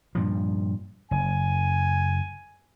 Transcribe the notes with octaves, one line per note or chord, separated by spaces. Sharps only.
G2 A#2 F3
F#1 G#5